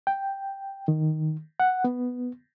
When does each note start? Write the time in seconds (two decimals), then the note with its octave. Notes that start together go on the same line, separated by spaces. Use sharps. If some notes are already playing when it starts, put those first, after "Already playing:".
0.07 G5
0.88 D#3
1.60 F#5
1.84 B3